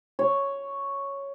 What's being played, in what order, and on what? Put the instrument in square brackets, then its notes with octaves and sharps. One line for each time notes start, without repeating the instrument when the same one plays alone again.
[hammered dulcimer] C#5